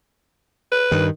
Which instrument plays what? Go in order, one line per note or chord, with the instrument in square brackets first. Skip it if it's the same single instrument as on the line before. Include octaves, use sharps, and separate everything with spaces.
[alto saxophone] B4
[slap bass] G2 D#3